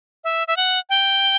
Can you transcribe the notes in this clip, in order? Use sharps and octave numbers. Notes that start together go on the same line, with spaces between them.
E5
E5
F#5
G5